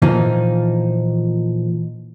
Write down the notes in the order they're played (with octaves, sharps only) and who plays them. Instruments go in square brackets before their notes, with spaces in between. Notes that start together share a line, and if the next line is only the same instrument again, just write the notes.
[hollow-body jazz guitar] A#2 E3 F3 D#4